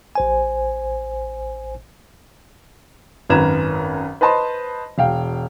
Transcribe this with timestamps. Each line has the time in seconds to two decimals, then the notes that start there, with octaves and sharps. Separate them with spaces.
0.15 A1 C5 G#5
3.30 G#1 F#2 B4 A#5 G#6 E7
4.21 B4 C5 D#5 A5 B5 C6
4.98 E1 F5 G5